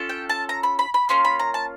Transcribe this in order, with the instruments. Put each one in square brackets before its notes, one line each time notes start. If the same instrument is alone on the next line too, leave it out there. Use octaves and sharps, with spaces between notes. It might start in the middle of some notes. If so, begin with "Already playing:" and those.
Already playing: [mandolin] C#4 F4 A4
G5
A5
A#5
B5
B5
B5
A#3 C#4 F4 C6
B5
A#5
A5